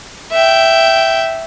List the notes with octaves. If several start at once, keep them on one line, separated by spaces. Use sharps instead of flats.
E5 G5